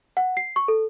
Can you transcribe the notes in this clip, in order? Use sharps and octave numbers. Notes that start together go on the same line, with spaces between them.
F#5
C7
C#6
A4